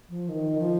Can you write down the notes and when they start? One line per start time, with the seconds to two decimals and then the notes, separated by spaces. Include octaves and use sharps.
0.09 F3
0.29 D#3
0.58 F3